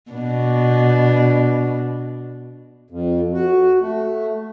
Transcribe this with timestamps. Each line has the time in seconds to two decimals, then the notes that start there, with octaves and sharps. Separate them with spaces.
0.11 B2 D4
2.90 F2
3.33 F#4
3.81 A3